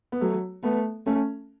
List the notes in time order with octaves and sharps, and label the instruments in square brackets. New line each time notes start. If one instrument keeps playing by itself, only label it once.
[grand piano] B3
[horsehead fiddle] F#3 [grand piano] A3
[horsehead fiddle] A3 [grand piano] B3
[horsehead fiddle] A3 [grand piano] C#4